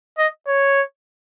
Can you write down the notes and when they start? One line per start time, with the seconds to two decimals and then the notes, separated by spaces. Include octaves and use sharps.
0.18 D#5
0.47 C#5